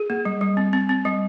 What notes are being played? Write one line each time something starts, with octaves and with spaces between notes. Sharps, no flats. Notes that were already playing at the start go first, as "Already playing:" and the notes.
Already playing: G#4
A#3
G3
G3
C4
C4
C4
G3